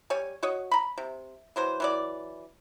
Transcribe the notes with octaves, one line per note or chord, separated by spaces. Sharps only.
G3 C#5 G#5
F#4 C#5 D#5
A#5 B5
C3
E3 F#3 C5
E3 F#3 D5